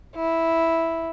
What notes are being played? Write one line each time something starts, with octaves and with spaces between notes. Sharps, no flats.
E4